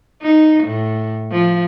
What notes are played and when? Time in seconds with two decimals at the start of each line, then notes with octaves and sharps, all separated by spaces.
0.22 D#4
0.64 A2
1.32 F3